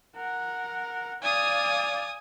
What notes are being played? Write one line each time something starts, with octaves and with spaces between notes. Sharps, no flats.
A#4 F#5
D5 F5 G#5 D#6